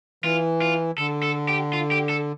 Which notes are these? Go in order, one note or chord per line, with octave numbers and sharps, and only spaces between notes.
E3 F4
F4
D3 A4
A4
G4
F4
G4
A4